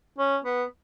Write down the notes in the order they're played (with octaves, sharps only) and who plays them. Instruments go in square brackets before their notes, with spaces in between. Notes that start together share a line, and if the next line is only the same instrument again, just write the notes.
[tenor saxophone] C#4
B3